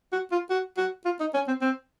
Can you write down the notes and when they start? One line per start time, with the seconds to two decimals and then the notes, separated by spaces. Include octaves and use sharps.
0.12 F#4
0.31 F4
0.50 F#4
0.77 F#4
1.05 F4
1.20 D#4
1.34 C#4
1.47 C4
1.61 C4